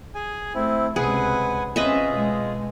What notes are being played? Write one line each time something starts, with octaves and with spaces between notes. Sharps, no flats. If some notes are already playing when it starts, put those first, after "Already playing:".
G#4 G#5
A3 C4 E4
C#2 C3 G#4 B4 F#5 G#5
C4 C#4 F4 G#4 B4 D#5 E5
B2 G#3